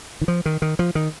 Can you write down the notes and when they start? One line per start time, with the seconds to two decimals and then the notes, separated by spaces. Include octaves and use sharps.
0.21 D#3
0.28 F3
0.46 D#3
0.62 D#3
0.79 F3
0.95 D#3